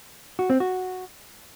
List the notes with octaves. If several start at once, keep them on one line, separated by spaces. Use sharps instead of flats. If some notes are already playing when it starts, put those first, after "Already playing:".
F#4
C4
F#4